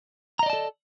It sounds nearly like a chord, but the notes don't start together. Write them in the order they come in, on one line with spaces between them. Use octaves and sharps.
A#5 D#5 D5 A5 A4